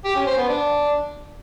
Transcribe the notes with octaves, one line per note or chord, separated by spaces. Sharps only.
G4
C#4
C5
B3
D4